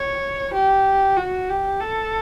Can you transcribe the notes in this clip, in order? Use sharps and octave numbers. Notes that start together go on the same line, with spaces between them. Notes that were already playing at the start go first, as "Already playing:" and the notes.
Already playing: C#5
G4
F#4
G4
A4